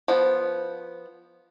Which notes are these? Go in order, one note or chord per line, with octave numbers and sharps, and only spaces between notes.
F3 B3